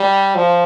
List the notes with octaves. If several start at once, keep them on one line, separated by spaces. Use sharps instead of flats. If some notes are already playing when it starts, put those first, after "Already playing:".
Already playing: G3
F3